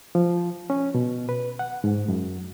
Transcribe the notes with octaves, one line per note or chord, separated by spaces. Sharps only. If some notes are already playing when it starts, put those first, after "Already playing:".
F3
C#4
B2
B4
F#5
G#2
F#2